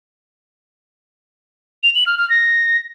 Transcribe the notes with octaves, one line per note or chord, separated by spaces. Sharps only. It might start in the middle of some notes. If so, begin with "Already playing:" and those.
F7
F#7
F6
F6
A#6